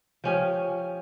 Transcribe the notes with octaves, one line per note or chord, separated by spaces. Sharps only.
F3 C#4 G4